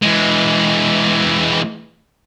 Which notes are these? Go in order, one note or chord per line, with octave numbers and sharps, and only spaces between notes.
E3 G#3